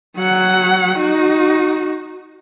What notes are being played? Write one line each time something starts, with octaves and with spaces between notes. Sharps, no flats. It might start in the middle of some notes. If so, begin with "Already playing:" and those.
F#3 F#5
D#4 F#4